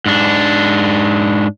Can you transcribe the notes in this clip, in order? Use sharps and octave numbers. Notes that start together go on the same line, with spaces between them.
G#2 D4